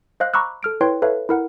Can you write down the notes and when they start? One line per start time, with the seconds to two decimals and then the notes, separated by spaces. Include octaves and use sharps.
0.20 C5 D#5 F5 F#6
0.34 A#5 B5 C#6 D6 E6 F#6
0.63 A4 F6 D7
0.81 E4 B4 C#5 G5 C6
1.02 A4 B4 C#5 E5 F5
1.29 E4 A#4 F#5